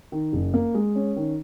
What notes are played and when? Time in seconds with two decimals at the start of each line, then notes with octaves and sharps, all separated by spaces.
0.12 D#3
0.33 F#1
0.54 A#3
0.75 G#3
0.95 C#4
1.16 D#3